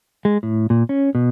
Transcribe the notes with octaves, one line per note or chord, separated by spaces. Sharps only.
G#3
A2
A#2
C#4
B2